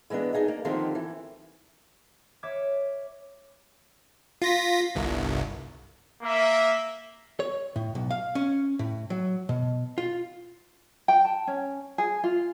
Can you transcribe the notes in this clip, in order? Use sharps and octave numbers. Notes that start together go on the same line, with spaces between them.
E3 G#3 A#3 B3 D4
D4 D#4 F4 G#4 D#5
A#3
D3 D#3 F3 A#3 C4 G4
E3
C#5 E5 D6 F6 F#6 G#6
F4 A#6 B6
G1 C2
A#3 E5
C#5
A2
B1
F5
C#4
A2
F#3
B2
F4
G5
A5
C#4
G#4
F4